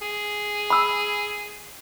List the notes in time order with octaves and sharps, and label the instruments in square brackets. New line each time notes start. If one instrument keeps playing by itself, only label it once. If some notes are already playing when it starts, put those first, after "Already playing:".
[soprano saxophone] G#4
[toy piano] B5 E6